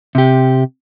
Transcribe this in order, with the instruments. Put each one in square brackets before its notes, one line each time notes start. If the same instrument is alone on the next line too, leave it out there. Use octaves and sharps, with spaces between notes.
[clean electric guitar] C3 G4